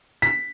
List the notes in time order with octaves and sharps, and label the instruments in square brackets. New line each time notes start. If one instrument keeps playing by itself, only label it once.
[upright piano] B6